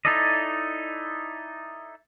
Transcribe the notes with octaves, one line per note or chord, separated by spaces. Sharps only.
D#4 E4 A4 D5 D#5